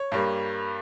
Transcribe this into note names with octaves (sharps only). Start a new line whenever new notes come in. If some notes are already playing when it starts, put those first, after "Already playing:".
Already playing: C#5
G2 G3 A#3